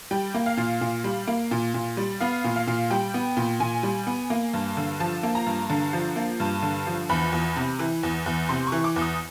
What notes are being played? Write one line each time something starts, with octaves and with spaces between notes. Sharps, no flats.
G3 G5
A#3
F5
A#2
A#2
G3
A#3
A#2
A#2
G3
B3 F5
A#2
F5
A#2
G3 G5
B3
A#2
A#2 G#5
G3
B3
A#3
G2
D3
F3 A5
A#3
A#5
G2
D3
F3
A#3
G2
D3
F3
E2 B5
E2
C3
E3
E2
E2
C3 C6
C#6
E3
D6
E2
D#6